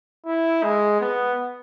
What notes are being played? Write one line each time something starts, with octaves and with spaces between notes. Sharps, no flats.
E4
G#3
B3